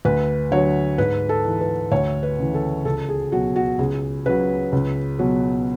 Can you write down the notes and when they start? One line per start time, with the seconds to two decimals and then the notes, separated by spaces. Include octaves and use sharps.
0.05 D2 B4
0.51 D3 F#3 C#5
0.98 G#2 B4
1.29 A4
1.45 E3
1.61 B4
1.91 D2 C#5
2.23 B4
2.38 C#3 E3
2.54 A4
2.85 C#2 A4
3.09 G#4
3.32 B2 F#3 F#4
3.56 F#4
3.79 C#2 G#4
4.26 C#3 F#3 B4
4.72 C#2
5.19 B2 F#3